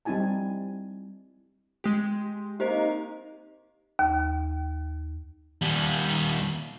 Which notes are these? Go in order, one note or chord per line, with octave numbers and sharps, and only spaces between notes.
G3 C4 D#4 E4 G#5 A5
G#3 G4
A#3 C4 D#4 G4 C5 D#5
D#2
D#2 G3